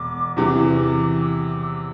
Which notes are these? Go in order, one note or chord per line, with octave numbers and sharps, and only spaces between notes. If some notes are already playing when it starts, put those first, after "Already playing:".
Already playing: E1 D6
E2 C3 E3 D6
E6
D6
E6